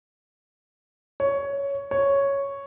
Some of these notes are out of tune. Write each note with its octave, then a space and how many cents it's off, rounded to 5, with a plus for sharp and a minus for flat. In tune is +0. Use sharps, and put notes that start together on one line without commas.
C#5 +10
C#5 +0